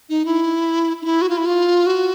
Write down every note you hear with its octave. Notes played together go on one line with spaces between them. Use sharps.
D#4
E4
D#4
E4
F#4
F4
E4
F4
F#4